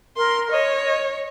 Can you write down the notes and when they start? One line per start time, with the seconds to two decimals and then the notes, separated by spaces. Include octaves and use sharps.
0.17 A#4 C6
0.51 C#5 D#5